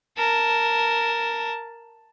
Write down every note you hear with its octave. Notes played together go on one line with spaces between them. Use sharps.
A#4 A5